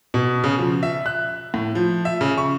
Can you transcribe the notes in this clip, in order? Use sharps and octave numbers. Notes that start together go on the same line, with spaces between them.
B2
C#3
F3
E5
F#6
A2
F3
E5
C#3
C#6